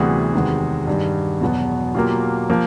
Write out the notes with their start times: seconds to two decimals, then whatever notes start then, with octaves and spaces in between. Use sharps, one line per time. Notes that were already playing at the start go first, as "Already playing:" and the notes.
Already playing: D2 C3 E3 G3 B3 F#4 G#4
0.34 E2 C3 D#3 G#3 B3
0.87 G2 D#3 G3
1.41 E2 B2 F#3 B3
1.95 B2 F#3 A#3 F4 G4
2.50 F3 A#3